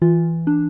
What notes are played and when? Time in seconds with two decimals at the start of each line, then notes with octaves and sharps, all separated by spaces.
0.02 E3 F4
0.47 D4